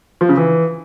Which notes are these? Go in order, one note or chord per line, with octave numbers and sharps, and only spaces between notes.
F3
C#3
E3